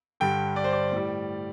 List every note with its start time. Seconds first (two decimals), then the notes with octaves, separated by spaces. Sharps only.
0.20 G2 D3 G3 G5
0.56 D5
0.64 C5
0.72 D5
0.92 A2 G3